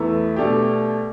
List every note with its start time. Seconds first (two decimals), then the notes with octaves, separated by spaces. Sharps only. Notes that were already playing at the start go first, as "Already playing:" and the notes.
Already playing: E2 E3 A3 E4
0.36 B2 A3 D4 G4